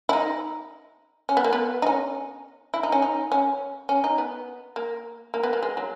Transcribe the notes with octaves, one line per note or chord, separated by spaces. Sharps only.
E4
D#4
C#4
B3
A#3
B3
D#4
C#4
E4
D#4
C#4
D#4
C#4
C#4
D#4
B3
A#3
A#3
B3
A#3
G#3
F#3